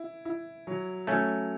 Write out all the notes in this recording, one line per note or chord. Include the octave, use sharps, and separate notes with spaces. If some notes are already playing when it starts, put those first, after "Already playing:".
Already playing: E4
E4
F#3
F#3 A3 C#4